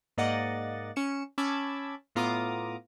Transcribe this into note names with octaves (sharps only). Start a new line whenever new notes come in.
G#2 A#3 D5 D#5 F#5 A6
C#4 C#7 E7
C#4 A5 B5 D6 E6 G#6
A2 B3 F4 A#5 D6 D#6